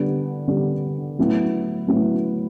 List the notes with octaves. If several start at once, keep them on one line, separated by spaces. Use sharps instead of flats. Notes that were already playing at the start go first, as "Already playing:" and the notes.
Already playing: D3 G3 B3
D3 G3 B3
A2 F#3 B3 E4
A2 F#3 B3 E4